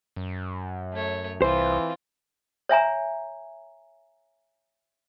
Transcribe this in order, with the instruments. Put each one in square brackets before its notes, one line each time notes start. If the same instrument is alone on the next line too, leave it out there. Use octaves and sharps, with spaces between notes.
[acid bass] F#2
[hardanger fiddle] A3 C#5
[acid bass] C2 [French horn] E3 [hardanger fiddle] C4 F4 [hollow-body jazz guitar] C5
[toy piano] C#5 E5 G#5 A#5